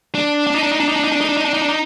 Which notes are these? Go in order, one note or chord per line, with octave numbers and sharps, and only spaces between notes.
D4
D4
D#4
D4
D#4
D4
D#4
D4
D#4
D4
D#4
D4
D#4
D4
D#4
D4
D#4